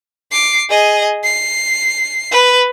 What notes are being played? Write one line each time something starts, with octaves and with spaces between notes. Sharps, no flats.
D6 C7
G#4 D#5
C7
B4